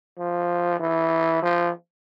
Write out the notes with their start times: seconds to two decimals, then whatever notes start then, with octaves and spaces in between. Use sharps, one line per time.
0.18 F3
0.80 E3
1.43 F3